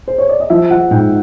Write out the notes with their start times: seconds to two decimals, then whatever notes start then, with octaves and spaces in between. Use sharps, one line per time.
0.08 C5
0.18 C#5
0.29 D5
0.40 D#5
0.50 F3 E5
0.70 F3 F#5
0.91 G#2 G5